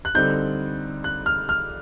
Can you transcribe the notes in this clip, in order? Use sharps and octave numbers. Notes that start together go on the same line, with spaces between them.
F#6
D3 G3 C4 D#4 G6
F#6
F6
F6